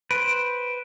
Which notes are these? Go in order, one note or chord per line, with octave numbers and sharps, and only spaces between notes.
B4 C5 D7